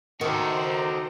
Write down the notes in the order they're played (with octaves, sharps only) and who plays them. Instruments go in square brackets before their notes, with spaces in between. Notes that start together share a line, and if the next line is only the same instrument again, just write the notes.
[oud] D#3 [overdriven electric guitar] F#4 A4 [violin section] C5 A#5